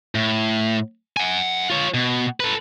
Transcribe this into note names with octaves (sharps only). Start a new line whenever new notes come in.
A2
F#5 G#5
F4 C#5
B2
A4 B4